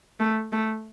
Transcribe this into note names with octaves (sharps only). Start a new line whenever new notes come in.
A3
A3